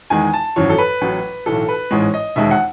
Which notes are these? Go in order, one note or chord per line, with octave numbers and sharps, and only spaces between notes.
E2 D#3 G#3 G#5
A5
G#1 F#2 E3 C#5
A4
B4
A1 A2 F#3
B1 A2 E3 A4
B4
A1 G#2 E3 G#3 C#5
D#5
E1 D#2 D#3 G#3 E5
F#5